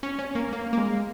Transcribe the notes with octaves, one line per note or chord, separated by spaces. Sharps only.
C#4
C#4
A#3
A#3
A#3
G#3